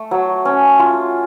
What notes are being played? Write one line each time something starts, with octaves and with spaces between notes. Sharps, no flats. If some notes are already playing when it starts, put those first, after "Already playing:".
Already playing: A3
F#3
C#4
F4